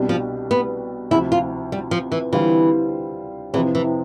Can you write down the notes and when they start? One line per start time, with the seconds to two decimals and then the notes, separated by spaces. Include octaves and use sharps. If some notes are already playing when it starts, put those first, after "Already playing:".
Already playing: C2 B2 G3 D4 G4
0.09 F3
0.51 B3
1.11 D2 C3 F3 E4
1.32 F4
1.72 G3
1.91 F3
2.12 E3
2.33 D3 E3 G3 C4 F4 C5
3.54 F2 C3 E3 F3
3.75 E3